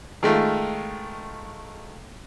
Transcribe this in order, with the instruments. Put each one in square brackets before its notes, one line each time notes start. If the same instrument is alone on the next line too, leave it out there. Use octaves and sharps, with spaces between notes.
[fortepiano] D#3 G#3 A3 F4